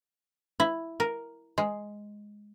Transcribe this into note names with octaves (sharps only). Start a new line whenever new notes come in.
E4
A#4
G#3